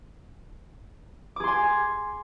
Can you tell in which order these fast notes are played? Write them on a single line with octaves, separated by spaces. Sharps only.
D6 G#4 C6 G#5